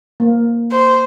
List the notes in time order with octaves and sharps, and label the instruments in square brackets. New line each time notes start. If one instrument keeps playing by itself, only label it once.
[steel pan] A#3
[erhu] C5